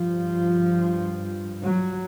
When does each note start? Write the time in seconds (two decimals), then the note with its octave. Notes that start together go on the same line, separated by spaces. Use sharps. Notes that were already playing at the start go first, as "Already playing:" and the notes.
Already playing: G2 F3
1.62 F#3